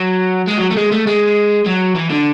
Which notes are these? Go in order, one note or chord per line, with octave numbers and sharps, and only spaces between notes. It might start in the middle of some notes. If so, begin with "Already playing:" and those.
Already playing: F#3
G#3
F#3
A3
G#3
A3
G#3
F#3
E3
D3